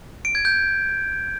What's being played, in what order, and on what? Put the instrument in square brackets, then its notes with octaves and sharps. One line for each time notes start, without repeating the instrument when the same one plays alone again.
[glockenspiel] D7
G#6
G6